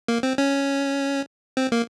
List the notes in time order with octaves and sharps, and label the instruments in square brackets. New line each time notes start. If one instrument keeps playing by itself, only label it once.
[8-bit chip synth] A#3
C4
C#4
C4
A#3